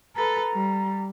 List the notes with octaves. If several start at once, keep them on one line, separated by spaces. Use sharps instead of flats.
A4 B4 A#5
G3